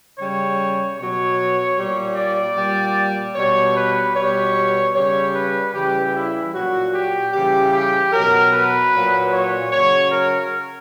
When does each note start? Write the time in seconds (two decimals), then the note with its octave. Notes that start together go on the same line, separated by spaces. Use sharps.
0.18 C#3 G3 C#5
0.97 B2 F#3 C#5
1.77 A#2 G3
2.17 D5
2.56 A#2 G3
3.36 B2 G3 C#5
3.76 B4
4.15 B2 G3 C#5
4.95 C#3 G3 C#5
5.35 B4
5.74 C#3 E3 G3 G4
6.15 E4
6.53 A#2 F#3 F#4
6.94 G4
7.33 C#3 E3 G3 G4
7.74 G4
8.13 B2 F#3 A#4
8.54 B4
8.93 A#2 F#3
9.33 C#5
9.73 C#3 F#3 C#5
10.12 A#4